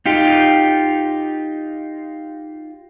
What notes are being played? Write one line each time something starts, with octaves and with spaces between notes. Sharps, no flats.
D#4 F4 G4